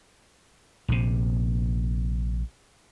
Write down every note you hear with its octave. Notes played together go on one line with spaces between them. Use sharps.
A#1 C3